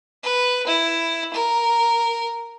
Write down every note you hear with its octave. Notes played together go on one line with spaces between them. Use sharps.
B4
E4
A#4